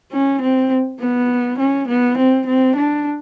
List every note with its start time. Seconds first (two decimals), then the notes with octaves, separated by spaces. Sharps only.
0.12 C#4
0.41 C4
1.00 B3
1.59 C#4
1.88 B3
2.18 C4
2.47 C4
2.76 D4